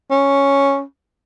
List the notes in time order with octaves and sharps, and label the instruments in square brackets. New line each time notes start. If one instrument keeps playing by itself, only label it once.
[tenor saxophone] C#4